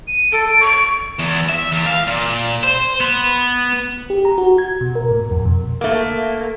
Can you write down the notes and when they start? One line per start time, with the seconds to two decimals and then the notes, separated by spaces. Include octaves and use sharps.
0.08 D#7
0.32 A4 D7
0.60 C#6
1.19 E2
1.49 E5
1.72 E2
1.86 F5
2.07 A#2
2.63 C5
3.00 B3
4.10 G4
4.25 A#5
4.38 F#4
4.58 G#6
4.81 B2
4.95 A#4
5.11 A2
5.31 F2
5.45 B2
5.81 A3 A#3